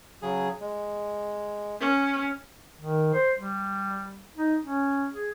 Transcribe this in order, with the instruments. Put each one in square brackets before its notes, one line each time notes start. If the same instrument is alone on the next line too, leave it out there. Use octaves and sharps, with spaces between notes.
[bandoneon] C#3 F#3 G#4
G#3
[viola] C#4
[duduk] D#3
C5
G3
D#4
C#4
G#4